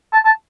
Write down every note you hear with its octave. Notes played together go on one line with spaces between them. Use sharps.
A5
A5